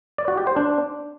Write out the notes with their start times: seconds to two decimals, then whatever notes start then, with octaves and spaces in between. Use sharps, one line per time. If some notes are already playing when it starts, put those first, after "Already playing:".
0.18 D5
0.28 F#4
0.37 G4
0.47 C5
0.56 D4